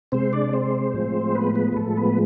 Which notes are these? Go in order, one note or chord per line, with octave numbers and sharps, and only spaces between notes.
C3 G#3 C4 C5
D4 D5
C4 C5
A2 F3 G#3
B3 B4
B3 B4
B4
A2 F3 G#3 A4
B3 B4